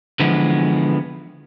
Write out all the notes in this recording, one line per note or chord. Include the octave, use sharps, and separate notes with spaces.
D3 E3 F3 G#3 B3